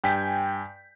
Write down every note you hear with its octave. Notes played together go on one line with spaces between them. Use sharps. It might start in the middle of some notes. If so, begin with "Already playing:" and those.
G2 G5 G#5 G6 B6